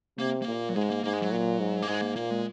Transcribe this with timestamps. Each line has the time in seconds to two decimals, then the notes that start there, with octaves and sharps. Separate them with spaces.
0.19 C3 A#3
0.42 A#3
0.47 A#2
0.69 F#3
0.75 G#2 G#3
0.90 A#3
1.04 G#2 A#3
1.13 G#3
1.22 F#3
1.31 A#2
1.60 G#2
1.82 A#3
1.88 G#2 G#3
2.02 A#3
2.16 A#2 A#3
2.31 G#3